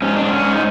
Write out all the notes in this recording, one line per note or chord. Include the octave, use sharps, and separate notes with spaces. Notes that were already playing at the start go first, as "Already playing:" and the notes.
G#2 C#4
D4
G#2
C#4
G#2
D#4